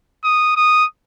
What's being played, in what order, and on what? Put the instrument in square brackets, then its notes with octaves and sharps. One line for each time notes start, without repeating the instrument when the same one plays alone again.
[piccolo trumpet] D#6
D#6